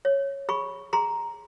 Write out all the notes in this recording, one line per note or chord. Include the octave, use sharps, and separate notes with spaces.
C#5
G#4 B5 C#6
G#4 A#5 C6